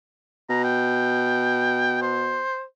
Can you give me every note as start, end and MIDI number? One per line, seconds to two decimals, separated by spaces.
0.50 2.43 47
0.50 0.60 82
0.64 1.99 79
2.02 2.63 72